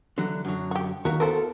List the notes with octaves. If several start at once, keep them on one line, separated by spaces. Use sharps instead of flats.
D3 E3 F#3
F#2 D3 F#3
F#4 G4
D#2 D#4 F#4 A#4 E5 F5
E3 B3 A4 A#4 C5